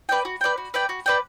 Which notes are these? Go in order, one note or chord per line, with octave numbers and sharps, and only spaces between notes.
B4 D5 G5
F#4
B4 D5 G5
F#4
B4 D5 G5
F#4
B4 D5 G5